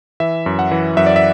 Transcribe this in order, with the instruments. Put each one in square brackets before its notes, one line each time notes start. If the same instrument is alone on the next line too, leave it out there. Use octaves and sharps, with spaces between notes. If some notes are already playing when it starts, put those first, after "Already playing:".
[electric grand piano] E3 E5
F#2
F#5
E3
F#2 E5
D5
E5